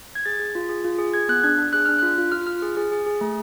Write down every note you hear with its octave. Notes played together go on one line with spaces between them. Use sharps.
G#6
G#4 A6
G#4
F4
G#4
F4
G#4
G#4 G#6
B3 F#6
D4 G#6
D4
G#4 F#6
D4 F6
F4 F#6
F4
F4 F6
F4 F6
G#4
G#4
G#4
G#4
A3